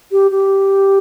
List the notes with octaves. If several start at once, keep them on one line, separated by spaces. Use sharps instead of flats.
G4
G4